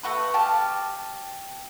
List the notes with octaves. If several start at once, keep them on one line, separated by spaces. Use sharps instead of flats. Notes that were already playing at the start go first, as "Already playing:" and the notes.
A3 F#4 B4
G4 F5 A5